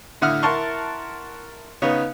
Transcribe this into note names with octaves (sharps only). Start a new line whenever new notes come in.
A2 D3 E5 F#5 D#6 F6
E4 A#4 F#5 A5 C6 C#6
C#3 B3 D#4 C#5